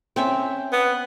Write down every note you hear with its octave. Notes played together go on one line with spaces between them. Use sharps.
C4 C#4 E5
B3